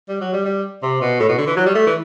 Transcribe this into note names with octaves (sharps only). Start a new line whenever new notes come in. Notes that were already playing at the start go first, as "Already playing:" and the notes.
G3
F#3
G3
G3
C3
B2
A2
B2
D3
E3
F#3
G3
A3
E3